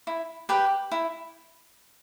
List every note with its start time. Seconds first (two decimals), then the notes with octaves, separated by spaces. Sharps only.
0.07 E4
0.49 G4 B4 G5
0.91 E4